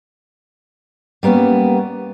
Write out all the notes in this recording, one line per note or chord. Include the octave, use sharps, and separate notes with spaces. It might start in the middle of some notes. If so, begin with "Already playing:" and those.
G3 A#3 B3 C#4